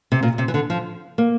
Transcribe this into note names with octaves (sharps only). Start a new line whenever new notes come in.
C3
A#2
C3
E3
D3
F3
A#3